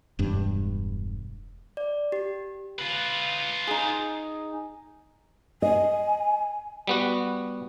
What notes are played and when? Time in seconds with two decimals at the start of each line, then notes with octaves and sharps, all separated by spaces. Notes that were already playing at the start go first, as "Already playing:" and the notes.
0.19 E1 G2
1.77 D5
2.12 G4
2.79 F4 B4
3.67 D#4 G#4
5.62 D#5 G#5
6.87 G3 B3 F#4